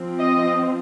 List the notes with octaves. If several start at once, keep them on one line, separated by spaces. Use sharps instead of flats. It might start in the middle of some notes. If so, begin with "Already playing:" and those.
Already playing: F3 C4
D#5